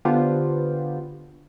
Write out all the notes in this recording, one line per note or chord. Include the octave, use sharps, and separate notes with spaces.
D3 B3 D4 F4 G4 C5